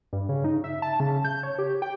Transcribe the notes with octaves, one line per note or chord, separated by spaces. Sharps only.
G2
C#3
D#4
E5
A5
C#3
G6
C#5
G4
G5